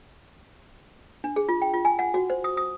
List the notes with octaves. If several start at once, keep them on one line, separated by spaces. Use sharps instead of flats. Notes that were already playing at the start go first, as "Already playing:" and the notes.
D4
G#4
F4
G5
F4
G#5
F#5
F#4
C5
D#6
D#6